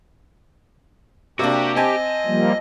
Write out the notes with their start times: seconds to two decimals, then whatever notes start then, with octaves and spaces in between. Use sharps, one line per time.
1.39 C3 A#3 D4 F#4 G4
1.76 C4 D#5 G#5 A5
2.26 F3 G3 A#3